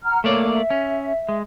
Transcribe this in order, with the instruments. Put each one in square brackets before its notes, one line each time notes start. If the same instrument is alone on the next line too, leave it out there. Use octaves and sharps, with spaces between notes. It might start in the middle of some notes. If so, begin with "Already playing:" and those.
[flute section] F#5 A#5 F6
[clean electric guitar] A3 A#3 D5 [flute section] C#5
[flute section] E5
[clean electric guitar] C#4
G#3